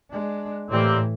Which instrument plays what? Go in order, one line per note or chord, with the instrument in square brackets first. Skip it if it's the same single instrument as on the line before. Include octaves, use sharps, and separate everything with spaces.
[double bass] G#3 D4
[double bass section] A2 [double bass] E3 [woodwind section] G3 A#3 C4